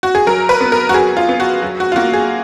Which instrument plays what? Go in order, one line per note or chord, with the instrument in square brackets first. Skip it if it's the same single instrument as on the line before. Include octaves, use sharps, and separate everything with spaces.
[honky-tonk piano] F#4
G#4
F#3 A#4
B4
B3
A#4
F#4
F#3 G#4
F4
B3
F#4
F#3
F#4
F4
A#3 F#4
G#4